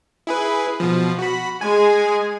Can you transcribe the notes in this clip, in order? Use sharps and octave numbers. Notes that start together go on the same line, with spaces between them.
E4 G#4 B4
B2 F3
F#4 B5
G#3 G#4 G#5